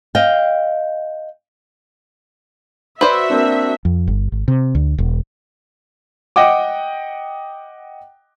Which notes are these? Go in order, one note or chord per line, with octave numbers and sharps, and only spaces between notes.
D#5 F5 G5
F#4 B4 C5 D5 E5
A#3 C4 D4
F2
G1
G#1
C3
D2
E1
D#5 F#5 G5 D6